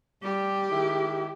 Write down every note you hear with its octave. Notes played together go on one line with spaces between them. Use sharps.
G3 G4
D#3 G#3 E4